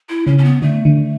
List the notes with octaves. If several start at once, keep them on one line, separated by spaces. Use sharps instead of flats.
E4
C#3 C#4
C#4
B3
D3 A3
D3